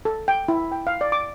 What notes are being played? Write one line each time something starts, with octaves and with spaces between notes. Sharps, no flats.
A4
G5
E4
G5
F5
D5
D6